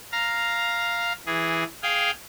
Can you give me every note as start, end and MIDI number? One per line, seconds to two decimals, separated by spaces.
0.12 1.13 77
0.12 1.13 82
1.26 1.64 52
1.26 1.64 68
1.83 2.11 68
1.83 2.11 77
1.83 2.11 79